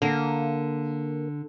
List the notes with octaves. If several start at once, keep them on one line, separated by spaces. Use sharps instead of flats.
D3 A#3